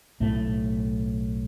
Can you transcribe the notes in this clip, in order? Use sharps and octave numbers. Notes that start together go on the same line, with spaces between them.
B1 A2 A3